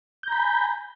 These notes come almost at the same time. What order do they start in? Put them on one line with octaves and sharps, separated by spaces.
G6 A#5 B5 G#5